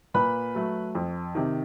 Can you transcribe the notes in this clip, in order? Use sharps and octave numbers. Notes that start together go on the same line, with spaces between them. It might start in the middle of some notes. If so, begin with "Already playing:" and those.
A#2 B4 B5
F#3 A3
F2
C3 D#3